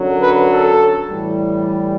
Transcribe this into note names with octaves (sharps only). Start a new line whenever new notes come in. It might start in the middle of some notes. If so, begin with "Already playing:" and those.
Already playing: F#2 D3 F#3
B4
A4
A2 E3 G3